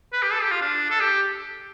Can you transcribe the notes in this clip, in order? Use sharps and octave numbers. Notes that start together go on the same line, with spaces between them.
B4
G4
A4
G4
F4
D4
A4
G4